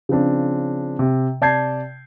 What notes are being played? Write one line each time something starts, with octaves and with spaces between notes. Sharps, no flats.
C#3 F3 C4 D4
C3
C3 D5 A5 G6 G#6 C7